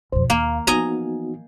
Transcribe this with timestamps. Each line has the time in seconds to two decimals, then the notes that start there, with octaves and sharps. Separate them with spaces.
0.12 B1 F2 C5
0.30 D#2 A#3 F5
0.67 E3 F3 B3 D#4 F#4 D#5 G#5 A#5